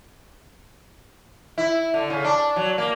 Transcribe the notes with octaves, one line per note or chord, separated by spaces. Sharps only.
E4
D3
C#3
D4
F#3
A#3